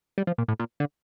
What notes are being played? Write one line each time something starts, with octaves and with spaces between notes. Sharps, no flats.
G3
F3
A#2
A2
A#2
D3